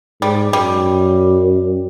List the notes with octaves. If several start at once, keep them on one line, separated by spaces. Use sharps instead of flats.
G#2 G3
F#2 G3